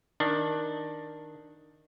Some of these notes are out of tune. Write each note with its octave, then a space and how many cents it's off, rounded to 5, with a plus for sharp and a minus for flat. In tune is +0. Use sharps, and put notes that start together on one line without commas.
D#3 +0 D4 +5